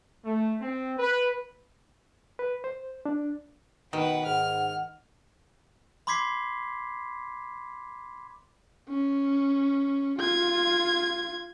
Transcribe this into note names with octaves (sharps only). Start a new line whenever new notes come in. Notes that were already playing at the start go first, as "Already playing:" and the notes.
A3
C4
B4
B4
C5
D4
B2 D#3 B4 F#5
G#2 F#5 F6
B5 C6 D6 G#6 B6 C7
C#4
F4 G#6